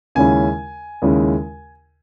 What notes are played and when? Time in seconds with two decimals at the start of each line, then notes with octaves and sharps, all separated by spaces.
0.15 D#2 C#3 G#3 C#4 E4 G#5
1.02 D#2 C#3 G#3 C#4 E4